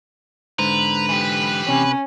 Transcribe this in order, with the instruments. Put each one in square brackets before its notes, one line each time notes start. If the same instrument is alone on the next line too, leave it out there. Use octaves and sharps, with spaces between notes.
[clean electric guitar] G#2 D3 C5 [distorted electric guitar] B4 [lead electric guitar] A#5
[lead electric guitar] E3 G4
[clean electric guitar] C3 [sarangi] C#4